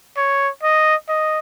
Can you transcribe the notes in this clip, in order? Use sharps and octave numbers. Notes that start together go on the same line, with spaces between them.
C#5
D#5
D#5